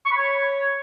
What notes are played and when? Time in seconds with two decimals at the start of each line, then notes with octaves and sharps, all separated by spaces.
0.06 C#6
0.11 B5
0.17 C#5